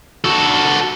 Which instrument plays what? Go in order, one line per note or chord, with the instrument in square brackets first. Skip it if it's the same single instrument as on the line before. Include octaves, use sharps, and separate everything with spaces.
[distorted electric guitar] F#4 A4